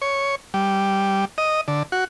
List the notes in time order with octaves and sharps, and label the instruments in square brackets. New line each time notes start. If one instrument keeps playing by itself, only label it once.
[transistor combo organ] C#5
G3
D#5
D3
F#4